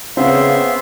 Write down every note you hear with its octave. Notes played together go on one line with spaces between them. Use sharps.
C#3 B3 C4 E5 F5 C6